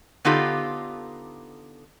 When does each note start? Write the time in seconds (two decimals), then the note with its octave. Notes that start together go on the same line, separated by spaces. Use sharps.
0.25 D3 B3 D#4 F4 G4 A4